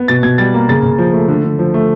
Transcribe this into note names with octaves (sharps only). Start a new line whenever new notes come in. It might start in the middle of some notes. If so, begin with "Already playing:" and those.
Already playing: B3
B2 A6
B2 G#6
G3 A6
A#3
C#3 A6
C#3
F3
A3
D3
D3
F3
A3